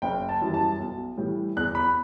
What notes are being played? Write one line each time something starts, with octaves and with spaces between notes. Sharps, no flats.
F#1 G5
A5
F#2 E3 G3
A5
B1
A2 E3 G3
E2 F#6
B5